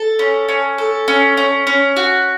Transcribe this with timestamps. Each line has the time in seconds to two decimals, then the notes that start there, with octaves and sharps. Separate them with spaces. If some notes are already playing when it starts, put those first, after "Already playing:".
Already playing: A4
0.19 C#4
0.48 C#4
0.78 A4
1.08 C#4
1.37 C#4
1.67 C#4
1.97 F#4